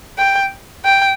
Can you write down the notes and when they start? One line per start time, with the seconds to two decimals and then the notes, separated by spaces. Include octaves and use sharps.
0.18 G5
0.85 G5